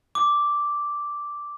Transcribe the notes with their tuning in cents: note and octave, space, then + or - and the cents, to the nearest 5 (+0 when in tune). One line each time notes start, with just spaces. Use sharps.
D6 -5